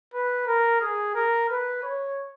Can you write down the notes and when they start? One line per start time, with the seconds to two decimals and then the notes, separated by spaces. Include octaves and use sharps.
0.14 B4
0.47 A#4
0.81 G#4
1.15 A#4
1.48 B4
1.83 C#5